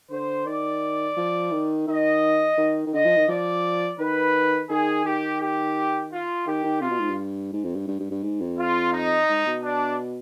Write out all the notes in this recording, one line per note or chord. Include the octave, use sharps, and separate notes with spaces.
D3 C5
D#3 D5
F3
D#3
D#3 D#5
D#3
D#3
D3 D#5
F3
D#3
F3 D5
D#3 B4
D#3 G#4
D#3 G4
G4
F4
D#3 G4
D#3
C3 F4
B2
G#2
G2
G#2
F2
G2
G2
G2
G2
G#2
F2
F4
D#4
G#2
B2
D4